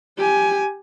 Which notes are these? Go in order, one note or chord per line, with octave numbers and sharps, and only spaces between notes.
G4 G#5